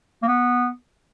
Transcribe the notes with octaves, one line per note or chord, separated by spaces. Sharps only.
A#3
B3